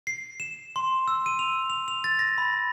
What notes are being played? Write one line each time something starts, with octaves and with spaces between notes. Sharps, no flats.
C7
E7
C6
E6
D#7
F7
F7
F7
A6
A#6
B5